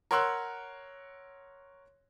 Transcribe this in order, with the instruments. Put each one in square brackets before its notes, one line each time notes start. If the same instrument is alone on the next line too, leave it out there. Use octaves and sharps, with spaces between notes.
[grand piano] A#4 C#5 F#5 C6 E6 F#6